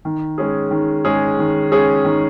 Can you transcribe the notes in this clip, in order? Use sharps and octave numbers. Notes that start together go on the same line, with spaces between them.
D#3
G#3 C#4 G#4
D#3
G#3 C#4 G#4
D#3
G#3 C#4 G#4
D#3